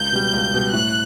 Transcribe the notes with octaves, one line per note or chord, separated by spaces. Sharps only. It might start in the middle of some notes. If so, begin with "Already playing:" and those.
Already playing: C#2 G6
B2 G3
C#2
B2 G3
A2 F#6